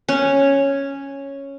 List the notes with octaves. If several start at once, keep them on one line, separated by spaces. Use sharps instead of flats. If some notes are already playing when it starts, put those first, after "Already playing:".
C#4